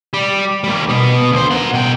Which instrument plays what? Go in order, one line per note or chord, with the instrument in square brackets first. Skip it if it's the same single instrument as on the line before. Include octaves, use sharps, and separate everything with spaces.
[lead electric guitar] G3 G4
G3 A#3
B2 B3
D2 C5
A#4 F#5
B2 G5